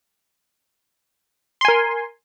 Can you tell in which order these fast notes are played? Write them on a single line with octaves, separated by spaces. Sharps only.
C6 G#5 A#4